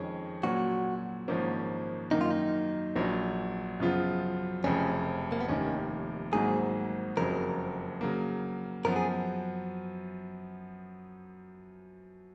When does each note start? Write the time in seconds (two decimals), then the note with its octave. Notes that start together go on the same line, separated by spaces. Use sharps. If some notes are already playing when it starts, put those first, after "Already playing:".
Already playing: F2 D#3 G#3 C#4 G#4
0.43 A#2 F#3 C#4 F#4
1.28 G#1 G#2 F3 A#3 C#4
2.11 F#2 D#3 A#3 D#4
2.21 F4
2.31 D#4
2.96 A#1 A#2 F#3 C#4
3.80 F#2 C#3 F3 B3 F4
4.64 F1 F2 C#3 C#4
5.32 A#3
5.40 B3
5.49 F1 D#2 D#3 C#4
6.32 G#1 G#2 F#3 A#3 G#4
7.16 F#1 F2 C#3 F#3 A#4
8.01 C#3 F#3 A#3
8.85 F#2 F3 B3 A#4
8.96 G#4